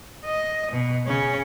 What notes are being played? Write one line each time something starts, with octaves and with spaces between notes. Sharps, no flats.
D#5
B2
C#3 C#4